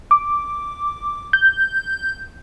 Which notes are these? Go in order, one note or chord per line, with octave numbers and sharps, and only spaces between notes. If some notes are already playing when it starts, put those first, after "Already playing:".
D6
G6